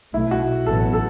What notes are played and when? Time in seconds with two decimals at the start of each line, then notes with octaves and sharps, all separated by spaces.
0.13 B1 B2 A3 E4
0.31 F#4
0.66 A1 A2 F#3 B3 A4
0.93 A4